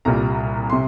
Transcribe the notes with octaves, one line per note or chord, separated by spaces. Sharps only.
C2 A#2 G3 A#5
C3 C6